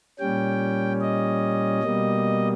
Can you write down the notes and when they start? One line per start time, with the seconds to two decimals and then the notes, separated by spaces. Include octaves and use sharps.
0.19 A#2 G3 C#4 G5
1.01 D#5
1.84 B2 G3 A#3